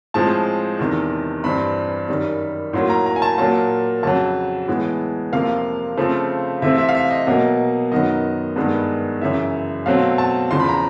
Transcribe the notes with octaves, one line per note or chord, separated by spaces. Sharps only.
A2 F3 G#3 C4 A5
E2 C3 D#3
G2 E3 G3 C4 B5
F#2 D#3 G3
A2 F#3 A#3 C6
A#5
A#5
G#5
A5
A#2 F#3 A#3 A5
F2 C#3 F#3 A5
A2 E3 G#3 B3
F2 C3 F3 A#3 F5
C#3 F3 A3 C4
C3 E3 A3 C4 E5
E5
F5
E5
D#5
B2 F#3 A#3 D#5
F#2 D#3 F#3 B3 D#5
G2 D#3 G#3 B3
F#2 C#3 E3 E5
B2 F#3 A3 C4 F5
A5
E2 C#3 F3 C6
B5
A#5